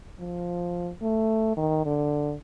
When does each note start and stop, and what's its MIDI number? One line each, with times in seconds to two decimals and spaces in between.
0.20 0.91 53
1.02 1.53 57
1.57 1.85 51
1.86 2.34 50